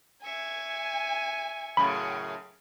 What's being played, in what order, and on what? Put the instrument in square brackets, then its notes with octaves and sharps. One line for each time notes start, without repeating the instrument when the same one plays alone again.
[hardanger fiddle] E5 C#6 [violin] G#5
[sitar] F#2 A2 C#3 [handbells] B5